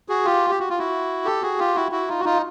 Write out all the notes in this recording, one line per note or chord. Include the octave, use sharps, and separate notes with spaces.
F#4 G#4
F4 G4
G4
F#4
F4
E4 F#4
G4 A4
F#4 G#4
F4 G4
E4 F#4
E4 F#4
D#4 F4
F#4
D#4 F4